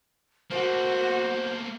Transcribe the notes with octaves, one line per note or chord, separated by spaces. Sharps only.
A3 A#3 F#4 C5